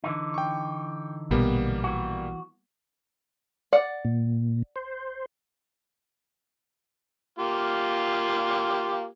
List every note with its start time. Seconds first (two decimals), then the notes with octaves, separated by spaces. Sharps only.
0.04 D3 E3 D#4
0.34 G5 C#6
1.31 A#1 B2 G3 A#3 B3
1.84 E3 F#4
3.73 D5 F#5
4.05 A#2
4.76 C5
7.39 A#3 F4 G4